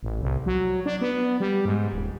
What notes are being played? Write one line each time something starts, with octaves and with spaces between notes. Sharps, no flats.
A1
C2
F#3
D4
B3
G3
G#2
D#1